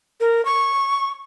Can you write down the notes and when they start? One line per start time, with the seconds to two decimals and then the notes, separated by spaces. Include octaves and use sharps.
0.21 A#4
0.45 C#6